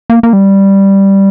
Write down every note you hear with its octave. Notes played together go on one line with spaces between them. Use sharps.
A#3
A#3
G3